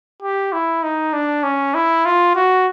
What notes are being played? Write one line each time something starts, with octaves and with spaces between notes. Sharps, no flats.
G4
E4
D#4
D4
C#4
E4
F4
F#4